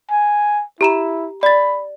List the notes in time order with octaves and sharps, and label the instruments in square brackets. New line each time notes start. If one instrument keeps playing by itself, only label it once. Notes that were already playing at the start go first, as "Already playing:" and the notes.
[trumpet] G#5
[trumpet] E4 [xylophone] G4 A#5 E7
[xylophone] D5 A6 [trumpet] B5